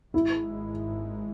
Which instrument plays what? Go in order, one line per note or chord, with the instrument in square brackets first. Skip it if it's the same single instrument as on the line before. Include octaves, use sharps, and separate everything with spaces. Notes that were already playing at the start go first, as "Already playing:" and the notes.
[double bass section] G#1 G#2 G#3 [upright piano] E4